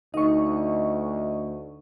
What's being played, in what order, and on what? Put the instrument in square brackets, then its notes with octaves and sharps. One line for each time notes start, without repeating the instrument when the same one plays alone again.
[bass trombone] D2 [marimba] D#4 [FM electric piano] D#5 C#6